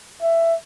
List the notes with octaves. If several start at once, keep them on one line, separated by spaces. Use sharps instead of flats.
E5